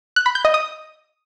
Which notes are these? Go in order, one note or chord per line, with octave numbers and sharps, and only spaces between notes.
F#6
B5
G6
D#5
D#6